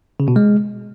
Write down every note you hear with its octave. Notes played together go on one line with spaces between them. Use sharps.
C#3
B2
G#3